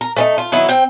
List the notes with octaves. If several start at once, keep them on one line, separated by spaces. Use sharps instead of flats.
A#4
A3 C4 D#4
F4
D#3 F#3 B3 E4
C4 G5